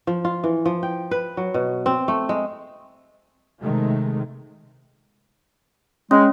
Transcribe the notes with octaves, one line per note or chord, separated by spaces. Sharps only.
F3
F4
E3
F3
G5
B4
F#3
B2
C4
A3
G#3
C3 D#3 G#3 A3
G#3 C#4